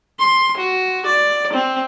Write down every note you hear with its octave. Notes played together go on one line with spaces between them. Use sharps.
C6
F#4
D5
C4